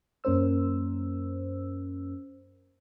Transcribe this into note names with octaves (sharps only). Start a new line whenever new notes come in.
F#2 A#3 C#4 A#4 C5 E6